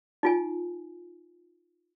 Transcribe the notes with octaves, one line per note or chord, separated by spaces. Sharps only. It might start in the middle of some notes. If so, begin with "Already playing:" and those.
D#4 F4 G#5